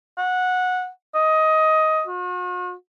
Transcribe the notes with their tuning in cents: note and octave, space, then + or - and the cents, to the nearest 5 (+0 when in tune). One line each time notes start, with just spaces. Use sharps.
F#5 -15
D#5 +15
F#4 -45